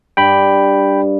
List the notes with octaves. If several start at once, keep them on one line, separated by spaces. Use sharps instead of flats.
G2 G5 B5